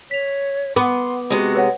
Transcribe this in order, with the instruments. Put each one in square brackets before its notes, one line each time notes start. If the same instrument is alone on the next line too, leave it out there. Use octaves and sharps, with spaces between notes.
[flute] C#5 [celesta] B6 F7
[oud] B3 [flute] C6 [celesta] D6
[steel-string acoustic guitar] C3 G#3 [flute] F#4
[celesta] B4 C#5 F#5